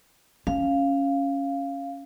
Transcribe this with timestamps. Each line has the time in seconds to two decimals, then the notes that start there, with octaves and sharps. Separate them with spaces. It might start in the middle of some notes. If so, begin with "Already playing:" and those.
0.47 C#4 F5